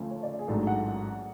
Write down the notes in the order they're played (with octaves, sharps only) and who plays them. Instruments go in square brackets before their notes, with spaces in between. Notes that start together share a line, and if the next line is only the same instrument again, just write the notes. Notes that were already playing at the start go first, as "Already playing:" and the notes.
Already playing: [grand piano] D2 C#3 F3 A3
[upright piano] C#5
D5
G#4
[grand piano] A1 G#2 F#3 A3 D4 [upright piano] A4
[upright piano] F#5